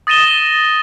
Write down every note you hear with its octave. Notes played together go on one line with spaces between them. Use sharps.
D#6 A6 A#6 D#7 E7 G7